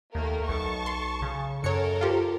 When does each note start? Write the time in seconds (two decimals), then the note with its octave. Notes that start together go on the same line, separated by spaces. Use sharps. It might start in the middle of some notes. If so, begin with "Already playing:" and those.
0.15 D#2 A3 A#3 A#4
0.49 B1 A5 C#6
0.86 C6
1.22 C#3
1.64 F#2 A4 A#4 C#5 C#7
2.01 F4 G4 C5